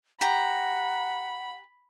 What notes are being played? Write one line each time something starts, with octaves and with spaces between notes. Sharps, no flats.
G4 F#5 A#5 B5